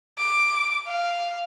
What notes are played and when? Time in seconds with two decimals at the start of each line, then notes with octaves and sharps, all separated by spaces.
0.18 D6
0.87 F5